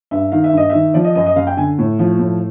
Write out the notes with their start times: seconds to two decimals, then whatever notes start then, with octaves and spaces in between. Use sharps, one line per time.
0.11 G2 E5
0.32 D#3 F5
0.44 E5
0.53 G2 D#5
0.70 D#3 E5
0.94 F3 D5
1.04 D#5
1.15 F#2 D#5
1.26 D#5
1.36 F#2 F5
1.47 G5
1.57 D3 G#5
1.79 A2
1.99 F3
2.19 A2